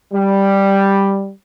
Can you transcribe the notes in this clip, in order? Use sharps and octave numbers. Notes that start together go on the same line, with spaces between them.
G3